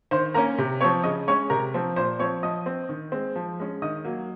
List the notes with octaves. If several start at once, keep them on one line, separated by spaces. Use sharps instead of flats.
D#3 C5 C6
A#3 C#4 A#4 A#5
C3
F3 C4 C#5 C#6
C#3 D#5 D#6
G#3 C#4 C#5 C#6
C3 A#4 A#5
F3 C4
A#2 C5 C6
F3 C4 C#5 C#6
F3 D#5 D#6
C4
D#3
G#3 C4
F3
G#3 C#4
D#3 D#5 D#6
F#3 A#3